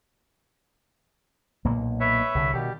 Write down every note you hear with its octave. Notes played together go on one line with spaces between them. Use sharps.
B1 A#2 A#3
B4 C#5 E5
C2 D3
B2 D#3 G3 G4